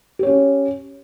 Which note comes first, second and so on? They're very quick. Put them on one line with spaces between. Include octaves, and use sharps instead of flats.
G4 C#5 C#4